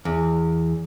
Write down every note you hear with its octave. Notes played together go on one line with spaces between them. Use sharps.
E2